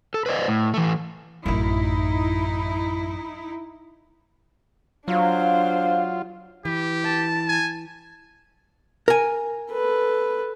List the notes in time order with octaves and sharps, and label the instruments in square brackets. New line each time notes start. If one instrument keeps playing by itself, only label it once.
[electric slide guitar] A4
B4 C5 D5 D#5
A2
E3 A3
[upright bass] A1 F#2 [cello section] D#4 E4
[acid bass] F#3 [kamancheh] D4 C5 [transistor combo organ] F4 [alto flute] F5
[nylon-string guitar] E3 [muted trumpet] G4
[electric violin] A5
[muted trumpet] G#5
[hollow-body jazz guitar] A#4 G#5
[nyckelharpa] A4 B4